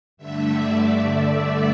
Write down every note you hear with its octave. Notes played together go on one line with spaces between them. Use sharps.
G2 D3 A3 E5
D5
D5